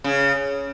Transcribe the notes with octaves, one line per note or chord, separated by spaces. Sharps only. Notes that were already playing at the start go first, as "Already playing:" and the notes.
C#3